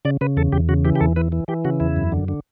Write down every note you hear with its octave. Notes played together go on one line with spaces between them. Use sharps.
C#3 D5
C#3 B4
E2 A4
E2 G4
C#3 F#4
E3 G4
G4
E2 A4
E3 B4
E3
E3 G4
C#3 F#4
E2 E4
F#2
D3
D3